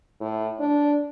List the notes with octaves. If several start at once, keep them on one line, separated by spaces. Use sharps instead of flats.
A2
D4